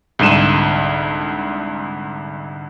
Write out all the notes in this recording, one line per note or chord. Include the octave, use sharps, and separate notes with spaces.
C2 G#2 D3 D#7 E7